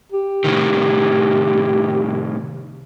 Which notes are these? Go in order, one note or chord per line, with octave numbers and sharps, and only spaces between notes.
G4
A2 C3 D#3